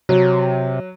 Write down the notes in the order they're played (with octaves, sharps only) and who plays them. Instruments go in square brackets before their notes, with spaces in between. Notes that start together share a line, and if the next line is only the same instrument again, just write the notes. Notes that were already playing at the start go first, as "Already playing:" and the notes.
[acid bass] C3 [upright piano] F#3